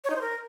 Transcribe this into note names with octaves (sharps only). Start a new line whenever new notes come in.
C#5
D#4
C5
A#4